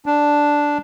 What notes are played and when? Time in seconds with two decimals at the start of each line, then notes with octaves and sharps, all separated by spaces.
0.06 D4